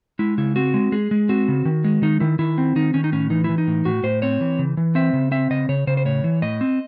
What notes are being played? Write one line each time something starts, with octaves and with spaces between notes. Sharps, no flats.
G#3 E4
C#3 E4
C4 F#4
G#3
G#3 G#4
G#3
C4 F#4
C#3
D#3
G#3
D#3 D#4
D#3 E4
D#3 E4
C4
D#3 D#4
D#3 C#4
D#4
A2 C#4
E3 D#4
E3 E4
D#4
A2
A2 F#4
A2 C5
C4 C#5
E3
C#3
E3
C4 E5
C#3
C4 E5
C#3 D#5
C#3 C#5
C#3 C5
C5
A2 C#5
E3
A2 D#5
C4